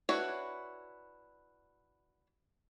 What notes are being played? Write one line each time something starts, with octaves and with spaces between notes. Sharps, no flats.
D4 E4 F#4 B4 C#5